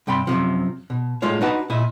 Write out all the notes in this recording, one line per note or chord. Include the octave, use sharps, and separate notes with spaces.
G2 C3 G5 B5 C6
F#2 A2 C3 F3
B2
A2 G#3 A3 F4 C#5
D4 D#4 F#4 B4 F#5 A5
A#2 E4 D#5